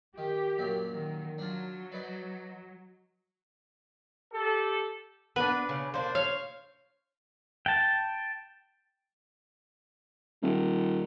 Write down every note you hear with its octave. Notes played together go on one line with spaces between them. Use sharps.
D#3 G4
F#2 A#2 F#3
D#3
F#3 D4 F4
D#4 B4 D5
G4 A4
B3 D4 B4
C#3
A#3 D4 C5
C#5 F5
G5 A5
D#1